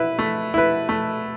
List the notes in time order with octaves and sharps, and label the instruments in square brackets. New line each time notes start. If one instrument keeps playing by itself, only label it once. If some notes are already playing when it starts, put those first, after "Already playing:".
Already playing: [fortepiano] E4 B4
A3
E4 B4
A3